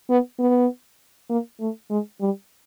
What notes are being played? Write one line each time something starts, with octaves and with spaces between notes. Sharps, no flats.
B3
B3
A#3
A3
G#3
G3